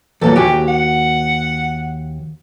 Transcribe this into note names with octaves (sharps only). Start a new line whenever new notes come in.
E2 A#2 F#3 A4
D#2 F#4 G4 G#5
F#5